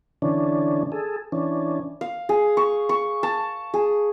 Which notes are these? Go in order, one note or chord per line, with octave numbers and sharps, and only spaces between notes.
D3 E3 C#4 D4
G#4 A4
E3 C#4 D4
F5
G#4
C#6
C#6
A5
G#4